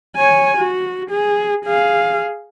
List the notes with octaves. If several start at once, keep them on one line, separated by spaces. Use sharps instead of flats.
C#5 G#5
F#4
G#4
G#4 F5